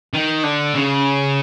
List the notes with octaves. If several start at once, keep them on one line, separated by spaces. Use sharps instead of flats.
D#3
D3
C#3